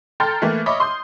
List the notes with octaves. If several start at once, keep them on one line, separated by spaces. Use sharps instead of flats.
A4 G5 A#5 C6 F6 A6
E3 A3 A#3
C#5 D#5 E5 B5 D6
C6 D#6 G6